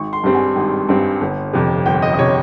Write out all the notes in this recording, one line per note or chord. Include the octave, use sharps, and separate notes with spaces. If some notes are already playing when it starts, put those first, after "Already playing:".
Already playing: G#1 C#6
C6
G2 G3 C4
G#5
G#1
G2 G3 C4
G1
F2 C3
G1 G5
D#5
D#5
C3 C#5